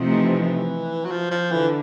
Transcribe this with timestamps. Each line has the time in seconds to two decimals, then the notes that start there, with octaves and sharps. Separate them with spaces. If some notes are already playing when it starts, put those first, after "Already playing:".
Already playing: C3 F3 A3 C4 D#4
0.11 E3
1.05 F#3
1.11 F3
1.31 F3
1.51 D3 E3